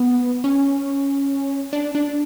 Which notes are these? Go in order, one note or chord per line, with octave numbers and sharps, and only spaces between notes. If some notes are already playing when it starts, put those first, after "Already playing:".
Already playing: B3
C#4
D4
D4